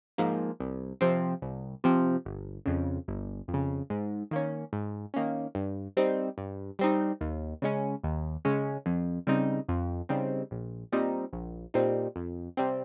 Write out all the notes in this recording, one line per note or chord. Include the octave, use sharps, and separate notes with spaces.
G#2 F3 A#3
C2
C3 F3 C4
C2
C3 F3 C4
G1
F2 C#3
G1
F2
C#3
G#2
D#3 A#3 C#4
G#2
D#3 A#3 C#4
G2
G3 C4 D#4
G2
G3 C4 D#4
D#2
C#3 G#3 C#4
D#2
C#3 G#3 C#4
F2
C#3 G3 C4 D#4
F2
C#3 G3 C4 D#4
A#1
A#2 G3 C4 D#4
A#1
A#2 G3 C4 D#4
F2
C3 G3 C4